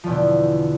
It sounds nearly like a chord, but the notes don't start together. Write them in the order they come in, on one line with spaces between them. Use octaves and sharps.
F3 E2 B2 D3